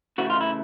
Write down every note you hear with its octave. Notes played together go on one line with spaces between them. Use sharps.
C#3 E3 A3 F#4
F4
E4